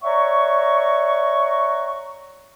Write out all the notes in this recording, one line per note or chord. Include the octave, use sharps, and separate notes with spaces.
C#5 D5 E5 F#5 A#5 C#6